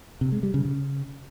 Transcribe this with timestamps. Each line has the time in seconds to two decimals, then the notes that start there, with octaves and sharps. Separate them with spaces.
0.21 C3
0.32 G#3
0.43 G3
0.54 C#3
0.65 C#3